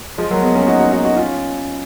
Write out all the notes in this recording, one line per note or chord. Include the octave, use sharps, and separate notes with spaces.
F3 G#3
F#3 A#3
G#3 B3
A#3 C#4
D#4 F#4
D#4 F#4
D#4 F#4
D#4 F#4
C#4 F4